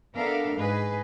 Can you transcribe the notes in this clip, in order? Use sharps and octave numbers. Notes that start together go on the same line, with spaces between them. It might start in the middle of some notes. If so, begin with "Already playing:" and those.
B3 D4 A4 A#4 E5 F5
G#2 G#4 B4 D#5